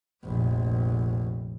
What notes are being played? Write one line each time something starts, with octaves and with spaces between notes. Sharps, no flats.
F1 A#1